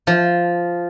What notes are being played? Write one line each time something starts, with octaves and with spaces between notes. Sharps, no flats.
F3